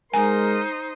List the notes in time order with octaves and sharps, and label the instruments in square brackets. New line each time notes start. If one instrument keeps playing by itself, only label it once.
[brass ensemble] G#3 A#4 [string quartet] D#4 C5 C6 [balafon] G#5